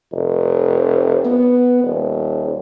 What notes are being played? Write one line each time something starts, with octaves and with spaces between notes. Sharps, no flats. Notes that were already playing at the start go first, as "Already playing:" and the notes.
F1
B3
D#1